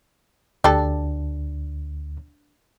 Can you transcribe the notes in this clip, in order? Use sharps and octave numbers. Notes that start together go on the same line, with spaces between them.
D2 D4 G4 A4